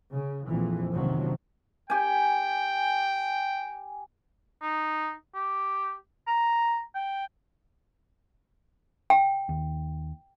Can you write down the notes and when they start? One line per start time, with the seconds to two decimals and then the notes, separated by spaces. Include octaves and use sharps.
0.11 C#3
0.46 A#1 F2 E3
0.92 A#1 F#2 C3 D#3 F3 F#3
1.90 G4 G5 G#5
4.62 D#4
5.35 G4
6.27 A#5
6.95 G5
9.10 G5
9.49 D#2